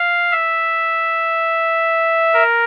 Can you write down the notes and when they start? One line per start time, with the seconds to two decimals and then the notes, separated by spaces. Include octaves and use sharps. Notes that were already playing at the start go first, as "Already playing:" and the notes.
Already playing: F5
0.31 E5
2.33 A#4